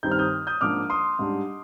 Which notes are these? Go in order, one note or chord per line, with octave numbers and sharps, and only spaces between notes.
G2 D#3 G3 C4 D#4 G6
F6
D#6 G6
D#6 G6
G#2 F3 A#3 D4 D6 F6
C6 D#6
G#2 G3 D4